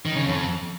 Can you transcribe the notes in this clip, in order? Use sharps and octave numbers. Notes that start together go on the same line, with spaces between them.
D#3
C#3
F2